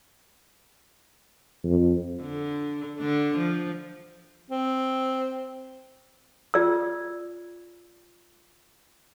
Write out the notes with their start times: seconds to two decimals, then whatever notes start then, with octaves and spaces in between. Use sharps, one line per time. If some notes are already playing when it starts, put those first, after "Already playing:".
1.64 F2
2.23 D3
2.98 D3 D4
3.38 F3
4.51 C4
6.54 F4 D5 E6